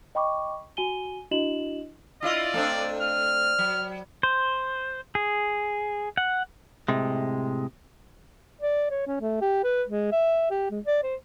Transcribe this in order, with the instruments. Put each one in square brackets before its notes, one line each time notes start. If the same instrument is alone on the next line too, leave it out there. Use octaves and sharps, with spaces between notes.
[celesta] D#5 G5 B5 C#6 D6
F#4 G#5 D#7 G7
D4 E4 F#4 D#5 E7 F#7
[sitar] E4 F4 D#5 [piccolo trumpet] D5
[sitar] A3 C4 D4
[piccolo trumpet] F6
[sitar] F#3
[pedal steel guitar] C5
G#4
F#5
[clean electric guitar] A2 C3 G#3
[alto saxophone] D5
C#5
C#4
A3
G4
B4
G#3
E5
G4
G#3
D5
C5